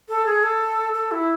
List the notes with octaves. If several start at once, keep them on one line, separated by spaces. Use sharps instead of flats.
A4
G#4
A4
A4
E4